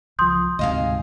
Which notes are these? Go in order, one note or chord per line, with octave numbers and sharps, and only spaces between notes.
C#2 F3 C6 D#6 G6
D2 G#2 C3 D#5 F5 G#5